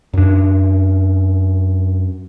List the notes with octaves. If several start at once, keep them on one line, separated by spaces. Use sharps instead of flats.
F#2 D4